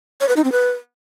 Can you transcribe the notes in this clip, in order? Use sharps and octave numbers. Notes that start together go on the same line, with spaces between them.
C#5
B4
D#4
C4
B4